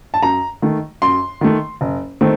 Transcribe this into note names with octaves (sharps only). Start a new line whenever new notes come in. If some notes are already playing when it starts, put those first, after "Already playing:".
A5
F#2 A#5
D#3 A3
F#2 C6
D#3 A3
F#1
D#3 A3 C4